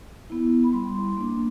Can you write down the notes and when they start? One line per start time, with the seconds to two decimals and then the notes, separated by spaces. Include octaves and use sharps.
0.30 B3 E4
0.64 B5
0.73 G3 C6
1.17 A#3 D4